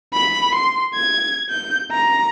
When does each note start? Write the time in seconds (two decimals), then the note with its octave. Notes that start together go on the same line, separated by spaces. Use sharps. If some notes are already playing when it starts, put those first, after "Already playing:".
0.13 B5
0.55 C6
0.94 G#6
1.50 G6
1.91 A#5